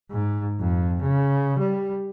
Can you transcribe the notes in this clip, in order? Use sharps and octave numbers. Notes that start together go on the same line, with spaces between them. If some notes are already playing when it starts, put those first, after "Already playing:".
G#2
F2
C#3
G3